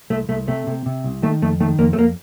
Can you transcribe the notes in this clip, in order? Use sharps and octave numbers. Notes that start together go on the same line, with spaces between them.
C2 A3
C2 A3
C3 A3
C3
C3
C2
D#3 A3
F2 A3
D#3 A3
F2 A#3
A3
F2 A#3